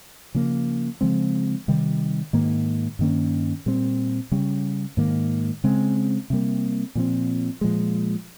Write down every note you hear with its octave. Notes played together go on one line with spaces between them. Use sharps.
C#3 F3 A#3
C#3 F3 G#3 C4
C3 D#3 G3
G#2 D#3 A#3
G2 D#3 A#3 C#4
A#2 G3 C4
C#3 G3 C#4
G#2 D#3 A#3
C#3 G#3 C4
C3 G3 A#3
A#2 F3 C4
A#2 F3 G#3